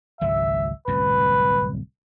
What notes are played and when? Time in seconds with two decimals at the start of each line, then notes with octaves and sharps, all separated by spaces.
0.21 G#1 C#2 F#3 E5
0.88 D1 C2 F#2 B4